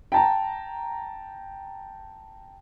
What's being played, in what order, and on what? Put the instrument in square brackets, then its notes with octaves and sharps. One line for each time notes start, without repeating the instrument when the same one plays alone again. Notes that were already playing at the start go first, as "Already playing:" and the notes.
[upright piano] G5 A5 A#5